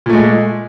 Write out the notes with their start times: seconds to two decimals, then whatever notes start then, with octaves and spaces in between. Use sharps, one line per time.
0.06 A#2
0.09 A3
0.13 G#3